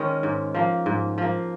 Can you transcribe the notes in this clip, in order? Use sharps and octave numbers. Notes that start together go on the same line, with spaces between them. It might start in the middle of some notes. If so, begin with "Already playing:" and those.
Already playing: D#3 G#3 C#4
G#2
F3 A#3
G#2
F3 A#3